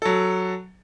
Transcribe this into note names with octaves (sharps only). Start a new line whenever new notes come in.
F#3 A4